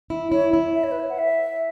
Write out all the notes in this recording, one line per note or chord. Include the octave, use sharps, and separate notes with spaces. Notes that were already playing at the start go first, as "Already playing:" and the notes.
E4
E4 C#5
E4
E5
C#5
B4
C#5
F#5
E5